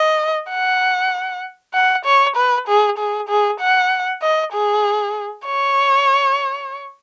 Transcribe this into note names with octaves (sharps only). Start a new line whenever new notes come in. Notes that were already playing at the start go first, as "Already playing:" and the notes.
Already playing: D#5
F#5
F#5
C#5
B4
G#4
G#4
G#4
F#5
D#5
G#4
C#5